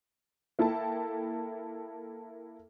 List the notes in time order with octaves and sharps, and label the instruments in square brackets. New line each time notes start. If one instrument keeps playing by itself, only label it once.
[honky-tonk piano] A#3 E4 A4 E5 G5 A5